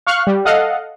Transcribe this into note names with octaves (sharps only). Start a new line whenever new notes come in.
F5 C#6 F6 F#6
G3
A4 D#5 F5 F#5